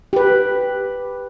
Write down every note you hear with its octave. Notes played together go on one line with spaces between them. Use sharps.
G4 B4